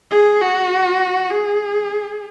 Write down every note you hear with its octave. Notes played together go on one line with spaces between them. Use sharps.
G#4
F#4
G#4